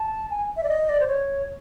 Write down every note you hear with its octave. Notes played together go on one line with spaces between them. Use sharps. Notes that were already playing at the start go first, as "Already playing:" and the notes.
Already playing: A5
G#5
E5
D5
D#5
D5
C5
C#5